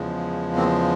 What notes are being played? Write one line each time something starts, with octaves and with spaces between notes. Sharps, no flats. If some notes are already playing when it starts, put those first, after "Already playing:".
Already playing: E2 C#3 F3 G#3
A#3 C4